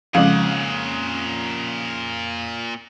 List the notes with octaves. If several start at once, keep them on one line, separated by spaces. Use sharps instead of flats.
F2 A#2 C#3 G#3 F5 F#5